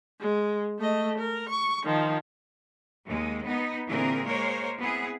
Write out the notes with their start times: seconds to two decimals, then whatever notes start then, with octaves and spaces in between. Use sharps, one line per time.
0.20 G#3
0.79 A3 D#5
1.19 A#4
1.50 C#6
1.84 D#3 F3
3.05 D#2 G#3
3.46 B3 D#4
3.87 A#2 D3 E3 C4 G#4 A#4
4.24 G#3 A#3 A#4 C5 C#5
4.79 B3 C4 E4 G#4